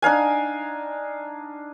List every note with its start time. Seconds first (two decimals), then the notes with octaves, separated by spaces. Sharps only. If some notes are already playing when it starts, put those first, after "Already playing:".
0.02 D4 D#4 F5 G#5